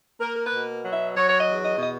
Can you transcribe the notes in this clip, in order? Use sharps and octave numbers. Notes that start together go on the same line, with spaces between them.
A#3 A#4
A#4
B4
B2
F#3
E5
F#3 C#5
C#5
D#5
E2
D#5
B2 D#5